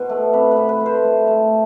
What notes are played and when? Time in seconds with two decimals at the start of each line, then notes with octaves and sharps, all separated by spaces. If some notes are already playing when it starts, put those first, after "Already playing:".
Already playing: B2 C5
0.09 A3
0.33 C3 B4
0.51 B4
0.56 C3
0.69 B4
0.81 A3
0.86 C5
1.04 A3
1.27 A3